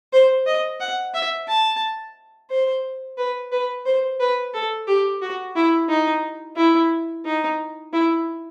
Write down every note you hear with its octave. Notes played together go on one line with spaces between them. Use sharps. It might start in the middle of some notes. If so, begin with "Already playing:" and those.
C5
D#5
F#5
E5
A5
C5
B4
B4
C5
B4
A4
G4
F#4
E4
D#4
E4
D#4
E4